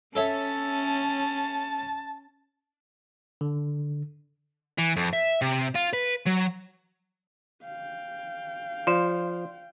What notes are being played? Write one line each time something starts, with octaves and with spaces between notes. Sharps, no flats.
C#4 A4 C#5 E5 A5
D3
E3
F2
E5
C3
F4
B4
F#3
F5 G5
F3 D5 C6 E7